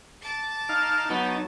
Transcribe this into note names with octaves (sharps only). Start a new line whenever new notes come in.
A5 D6
D#4 F5 F6
F#3 B3 D#4